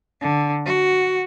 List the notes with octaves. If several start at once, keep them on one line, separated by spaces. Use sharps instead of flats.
D3
F#4